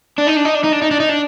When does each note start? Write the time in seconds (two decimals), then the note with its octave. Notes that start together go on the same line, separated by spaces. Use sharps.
0.18 D4
0.27 D#4
0.37 D4
0.45 D#4
0.55 D4
0.64 D#4
0.73 D4
0.82 D#4
0.91 D4
1.00 D#4
1.09 D4